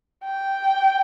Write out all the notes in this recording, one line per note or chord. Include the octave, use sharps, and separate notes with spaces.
G5